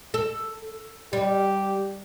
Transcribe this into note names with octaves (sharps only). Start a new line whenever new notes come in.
A4
G3 G4